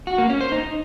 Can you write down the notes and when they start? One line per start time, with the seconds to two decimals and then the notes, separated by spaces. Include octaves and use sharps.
0.07 F#4
0.18 A#3
0.29 C#4
0.41 C5
0.52 D#4